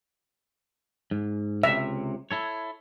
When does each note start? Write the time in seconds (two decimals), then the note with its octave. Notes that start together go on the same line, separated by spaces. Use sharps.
1.11 G#2
1.63 C#2 C3 E5
2.31 E4 A4 C#5